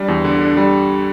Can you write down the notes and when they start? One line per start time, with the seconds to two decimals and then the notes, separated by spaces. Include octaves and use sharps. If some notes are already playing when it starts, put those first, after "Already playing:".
Already playing: G3 D4
0.08 E2
0.24 D3
0.41 D4
0.57 G3